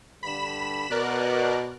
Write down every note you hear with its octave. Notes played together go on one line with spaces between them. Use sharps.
G2 D3 B5 B6 E7
B2 A#4 D5 F#6